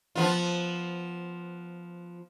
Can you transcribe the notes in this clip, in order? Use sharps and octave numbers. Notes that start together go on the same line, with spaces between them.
F3 B3 F4